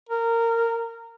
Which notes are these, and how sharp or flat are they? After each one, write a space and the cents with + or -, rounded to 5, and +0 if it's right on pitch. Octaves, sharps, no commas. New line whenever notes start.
A#4 -15